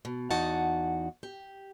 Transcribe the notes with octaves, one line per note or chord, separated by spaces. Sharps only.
B2
E2 D#4 F#4 F#5 A5
G4